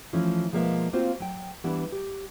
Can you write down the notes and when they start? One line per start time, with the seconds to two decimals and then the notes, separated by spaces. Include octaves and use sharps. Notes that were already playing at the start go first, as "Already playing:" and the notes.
0.13 E3 F3 A3 C#4 E4
0.52 B2 F3 G#3 A#3 C5 E5
0.93 A#3 C4 F4 F#4 C5
1.20 F#3 G5
1.64 E3 G3 B3 D4 E4
1.92 G4